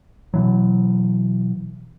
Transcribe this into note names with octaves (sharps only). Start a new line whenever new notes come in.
B2 E3 F#3